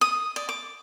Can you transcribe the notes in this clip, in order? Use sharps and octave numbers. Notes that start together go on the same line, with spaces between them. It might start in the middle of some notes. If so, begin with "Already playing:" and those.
D#6
D5
D6